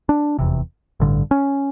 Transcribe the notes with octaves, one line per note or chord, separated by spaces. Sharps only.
D4
F1 E2 C3
A1 G2 D3
C#4